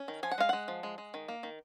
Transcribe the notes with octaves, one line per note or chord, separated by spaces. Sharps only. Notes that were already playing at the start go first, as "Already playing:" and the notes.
Already playing: C#4
D#3
F3 G#5
F#5
G#3 F5
G#3 F#5
F3
G#3
G#3
D#3
A#3
D#3